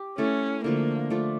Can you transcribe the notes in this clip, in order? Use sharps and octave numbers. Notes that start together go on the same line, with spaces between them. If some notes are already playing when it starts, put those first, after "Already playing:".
Already playing: G4
A3 C#4 E4 A4
D3 F3 A3 A#3
F3 A3 D4 F4